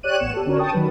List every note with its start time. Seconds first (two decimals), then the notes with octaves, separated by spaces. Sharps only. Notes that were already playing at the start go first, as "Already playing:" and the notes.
0.03 G4 C#5 D5 F#6 D#7
0.19 A1 B3 C#5 C#7 E7
0.34 G4 A4
0.46 D3 C#4 D4 F#4 A#4 C#5
0.59 G5 A5 C#6 D#6
0.73 D#3 F#3 B4